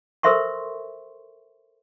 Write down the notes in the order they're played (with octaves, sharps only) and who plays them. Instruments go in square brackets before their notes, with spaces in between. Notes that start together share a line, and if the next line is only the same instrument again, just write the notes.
[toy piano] A4 A#4 C5 E5 C6 C#6